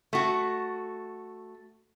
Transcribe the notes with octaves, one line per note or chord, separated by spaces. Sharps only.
A3 F#4